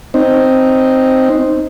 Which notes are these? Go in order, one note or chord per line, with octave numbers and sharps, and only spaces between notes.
C4 D#4